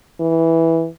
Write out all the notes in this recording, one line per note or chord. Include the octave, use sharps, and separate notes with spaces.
E3